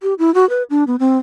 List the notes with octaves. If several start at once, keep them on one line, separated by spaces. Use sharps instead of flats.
G4
E4
F#4
B4
D4
B3
C4